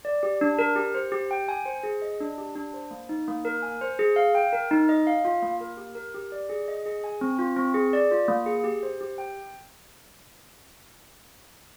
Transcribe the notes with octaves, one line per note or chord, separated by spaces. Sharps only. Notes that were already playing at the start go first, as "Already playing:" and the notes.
D5
G4
D4
A#4
G4
C5
G4
G5
G#5
C5
G#4
D#5
D4
G4
D4
C5
A#3
D#4
A#3
A#4
G#5
C5
G#4
F5
G5
A#4
D#4
D#5
F5
F4
A#3
A#4
G4
A#4
G4
D5
G#4
D#5
G#4
G#5
C4
F4
C4
G#4
D5
F4
A#3
G#4
G4
C5
G4
G5